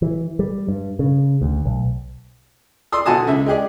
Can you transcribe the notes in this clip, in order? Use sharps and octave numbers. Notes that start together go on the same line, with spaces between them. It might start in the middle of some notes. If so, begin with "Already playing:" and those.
E3
G3
G2
C#3
D2
B1
D5 C6 D#6 E6
B1 D3 F#4 G#5 A5 D#6
C#2 G#3 E5
G#3 G4 G#4 D5